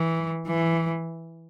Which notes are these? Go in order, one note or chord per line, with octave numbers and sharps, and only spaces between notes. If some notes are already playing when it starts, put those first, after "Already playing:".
Already playing: E3
E3